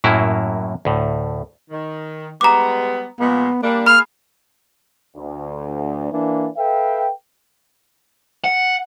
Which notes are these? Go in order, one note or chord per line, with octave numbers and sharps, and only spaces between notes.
F#2 A2 F#3 A#3 E4
D2 A2
D#3
G3 G#3 B3 A#5 D6
A#2 F3 G#3 B3
G3 A#3 D4
G#4 F5 B5 F6
D2
E3 A#3 D4
A4 B4 E5 F5 G5
F#5